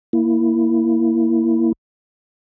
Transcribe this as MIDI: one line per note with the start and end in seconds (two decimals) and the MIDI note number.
0.13 1.73 58
0.13 1.73 64